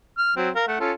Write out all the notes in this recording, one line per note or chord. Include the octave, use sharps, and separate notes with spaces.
F6
F#3 C4
A#4 F5
A3 F#5
C#4 F4 A4